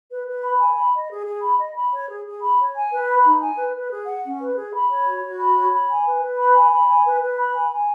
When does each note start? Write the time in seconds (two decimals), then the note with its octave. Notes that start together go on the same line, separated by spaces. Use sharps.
0.10 B4
0.26 B4
0.43 B5
0.59 G#5
0.77 B5
0.93 D#5
1.09 G#4
1.26 G#4
1.42 B5
1.59 D#5
1.75 B5
1.92 C#5
2.08 G#4
2.24 G#4
2.42 B5
2.58 C#5
2.75 G#5
2.91 B4
3.07 B5
3.24 D#4
3.41 G#5
3.57 B4
3.74 B4
3.90 G#4
4.07 F#5
4.23 C#4
4.40 B4
4.56 G#4
4.73 B5
4.90 C#5
5.06 F#4
5.23 F#4
5.39 B5
5.55 C#5
5.72 B5
5.88 G#5
6.06 B4
6.21 B4
6.38 B5
6.55 G#5
6.71 B5
6.87 G#5
7.05 B4
7.21 B4
7.37 B5
7.53 G#5
7.71 G#5